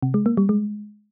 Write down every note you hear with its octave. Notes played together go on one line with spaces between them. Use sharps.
C3
G#3
A#3
G3
G#3